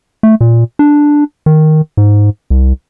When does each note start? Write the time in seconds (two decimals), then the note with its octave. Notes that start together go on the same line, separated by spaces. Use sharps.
0.23 A3
0.41 A#2
0.79 D4
1.46 D#3
1.97 G#2
2.50 C2